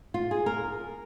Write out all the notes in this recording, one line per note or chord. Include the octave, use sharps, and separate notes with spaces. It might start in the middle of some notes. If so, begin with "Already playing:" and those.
F4
G#4
A#4